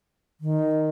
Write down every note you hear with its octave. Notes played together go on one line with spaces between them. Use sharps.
D#3